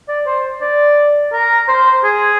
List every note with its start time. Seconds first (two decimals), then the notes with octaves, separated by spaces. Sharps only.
0.08 D5
0.26 C5
0.62 D5
1.33 A#4
1.69 C5
2.04 G#4